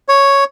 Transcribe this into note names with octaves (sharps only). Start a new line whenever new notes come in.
C#5